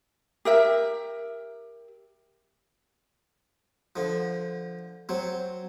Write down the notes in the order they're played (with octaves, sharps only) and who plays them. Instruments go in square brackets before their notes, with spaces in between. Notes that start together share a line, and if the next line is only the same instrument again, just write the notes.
[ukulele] G4 A#4 E5
[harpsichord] D3 F3
F#3 C4